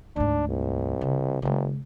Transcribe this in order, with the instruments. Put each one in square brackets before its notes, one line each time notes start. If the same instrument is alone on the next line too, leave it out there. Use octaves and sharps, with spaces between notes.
[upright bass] D2 G#2 [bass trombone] D4
[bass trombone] C2
[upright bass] C#3
[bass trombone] F#1 [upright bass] C#3 G#3